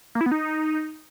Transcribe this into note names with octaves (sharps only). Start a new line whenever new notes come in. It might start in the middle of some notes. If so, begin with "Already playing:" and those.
A#3
E4
B3
D#4